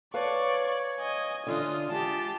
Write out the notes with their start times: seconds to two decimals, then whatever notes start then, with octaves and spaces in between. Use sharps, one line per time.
0.14 B4 C#5 D5 F5 A5 C#6
1.00 D#5 G#5
1.47 D3 E3 D4 F4 D#6
1.90 G#3 F4 G4 A5